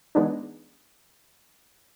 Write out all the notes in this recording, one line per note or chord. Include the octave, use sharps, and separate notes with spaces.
E3 G#3 B3 D4 D#4